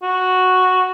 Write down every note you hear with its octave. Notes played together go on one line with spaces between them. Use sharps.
F#4